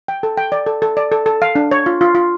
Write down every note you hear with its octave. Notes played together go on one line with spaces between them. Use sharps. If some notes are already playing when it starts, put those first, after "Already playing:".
G5
A4
G5
D5
A4
A4
D5
A4
A4
F5
D4
C#5
F4
F4
F4